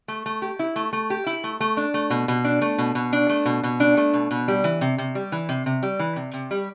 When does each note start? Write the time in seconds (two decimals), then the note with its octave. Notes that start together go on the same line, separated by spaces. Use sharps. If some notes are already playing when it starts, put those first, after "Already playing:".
0.08 A3
0.26 A3
0.42 G4
0.59 E4
0.76 A3
0.93 A3
1.10 G4
1.26 E4
1.44 A3
1.60 A3
1.77 D4
1.94 A3
2.10 B2
2.28 B2
2.45 D4
2.62 A3
2.78 B2
2.95 B2
3.13 D4
3.29 A3
3.46 B2
3.63 B2
3.80 D4
3.97 A3
4.14 B2
4.31 B2
4.48 G3
4.64 E3
4.81 C3
4.98 C3
5.15 G3
5.32 E3
5.49 C3
5.66 C3
5.83 G3
5.99 E3
6.16 C3
6.33 C3
6.51 G3